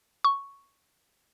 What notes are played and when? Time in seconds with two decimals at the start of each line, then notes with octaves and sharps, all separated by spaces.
0.24 C#6